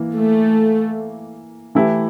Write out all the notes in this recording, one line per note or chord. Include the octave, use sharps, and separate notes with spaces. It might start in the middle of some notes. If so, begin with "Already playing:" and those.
Already playing: E3 A#3
A3
E3 A3 E4 G4